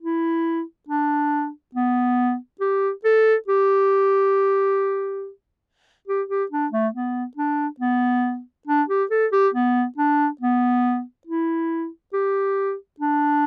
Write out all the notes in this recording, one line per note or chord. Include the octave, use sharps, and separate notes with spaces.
E4
D4
B3
G4
A4
G4
G4
G4
D4
A3
B3
D4
B3
D4
G4
A4
G4
B3
D4
B3
E4
G4
D4